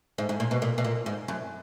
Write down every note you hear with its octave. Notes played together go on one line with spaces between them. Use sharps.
G#2
G#2
A#2
B2
A#2
B2
A#2
G#2
F#2